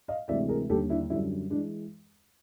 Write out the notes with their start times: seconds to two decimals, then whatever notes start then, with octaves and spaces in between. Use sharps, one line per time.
0.08 D#5 F5
0.28 D2 C3 E3 G#3 D5 E5
0.48 G#4 A#4
0.70 D#2 D3 G3 G4 A4
0.89 D4 E4
1.10 F#2 D3 G3 D4 E4
1.50 E3 G#3 D4